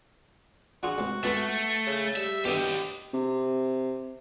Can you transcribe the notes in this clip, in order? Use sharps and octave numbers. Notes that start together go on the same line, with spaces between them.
D4 F4 F#4 G#4
C#2 A2 C3
C#2 A3 B3 B5
C#3
G3 E5
B2 D3 G4 D#5
C3